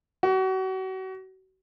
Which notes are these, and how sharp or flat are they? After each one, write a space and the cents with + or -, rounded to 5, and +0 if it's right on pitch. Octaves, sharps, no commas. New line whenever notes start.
F#4 +35